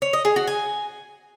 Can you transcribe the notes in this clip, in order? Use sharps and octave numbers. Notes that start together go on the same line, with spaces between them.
C#5
D#5
G#4
F#4
G#5